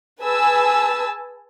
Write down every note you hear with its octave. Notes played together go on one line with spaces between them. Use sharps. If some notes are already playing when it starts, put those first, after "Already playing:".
G#4 B4 G#5 A5 E6